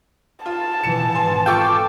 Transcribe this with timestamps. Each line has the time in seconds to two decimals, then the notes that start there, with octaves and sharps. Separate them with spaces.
0.46 F4 A5
0.83 B2 E3 C#7 E7
1.15 G#1 G#5 C6
1.46 F4 A4 G5 C#6 D6